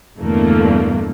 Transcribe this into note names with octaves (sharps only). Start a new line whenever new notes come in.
E2 G2 B2 D3 A3 A#3